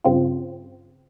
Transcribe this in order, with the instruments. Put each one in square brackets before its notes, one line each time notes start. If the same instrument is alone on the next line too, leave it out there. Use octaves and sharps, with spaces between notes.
[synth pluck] G2 C#3 C4 F4